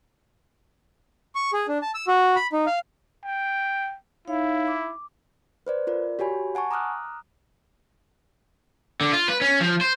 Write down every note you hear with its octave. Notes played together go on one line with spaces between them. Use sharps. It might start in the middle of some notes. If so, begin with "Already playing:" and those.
C#6
G#4
D4
A5
E6
F#4
B5
D#4
F5
G5
D#4 E4 C#5 F5
D6
B4 C5 D5
F4 A#4 D5
F#4 G4 C#5 G#5 B5
F#5 G#5 A5 C#6
A#5 D6 D#6 F6 F#6
D3
F4
B4
C#4
F3
C5